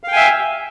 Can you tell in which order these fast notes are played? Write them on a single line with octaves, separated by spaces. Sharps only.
F5 G5 G#5 E5